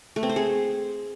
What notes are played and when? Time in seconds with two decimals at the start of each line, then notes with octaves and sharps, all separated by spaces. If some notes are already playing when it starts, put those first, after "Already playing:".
0.16 A3
0.23 C4
0.29 C5
0.36 G#4